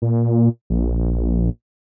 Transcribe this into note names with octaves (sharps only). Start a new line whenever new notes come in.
A#2
A#1